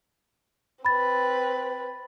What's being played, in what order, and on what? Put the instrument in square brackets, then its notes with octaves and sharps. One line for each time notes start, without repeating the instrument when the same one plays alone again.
[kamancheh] C4 B4 [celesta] B5 A6